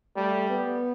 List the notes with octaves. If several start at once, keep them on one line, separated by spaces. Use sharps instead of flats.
G3 A3
B3